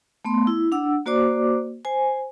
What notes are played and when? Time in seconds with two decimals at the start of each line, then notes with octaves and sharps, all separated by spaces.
0.25 A3 B3 C6
0.47 E4
0.72 D4 F#5 E6
1.06 A#3 F#4 C5 D5 D6
1.85 C5 G#5